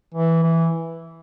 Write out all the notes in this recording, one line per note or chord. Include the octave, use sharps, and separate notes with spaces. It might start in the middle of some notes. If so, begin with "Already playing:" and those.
E3
E3